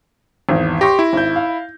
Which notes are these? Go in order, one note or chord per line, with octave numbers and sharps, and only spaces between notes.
G#1 E2
G4 C6 C#6 A#6
E4
G#1 G6
F5